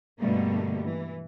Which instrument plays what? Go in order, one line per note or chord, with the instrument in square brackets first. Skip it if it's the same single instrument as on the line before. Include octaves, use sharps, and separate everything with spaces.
[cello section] G2 B2 D3 G3 A3 A#3
E3